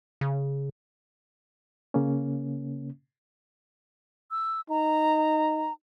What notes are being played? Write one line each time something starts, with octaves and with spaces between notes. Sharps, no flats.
C#3
C#3 A#3 C#4
E6
D#4 A#5